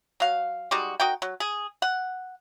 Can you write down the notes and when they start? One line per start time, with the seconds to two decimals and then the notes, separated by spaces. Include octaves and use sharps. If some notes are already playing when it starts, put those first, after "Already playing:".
0.20 F#3 F5
0.71 G3 G#3 D#4 F#4
1.00 D#4 F#4 A#4 G5
1.22 F#3
1.40 G#4
1.82 F#5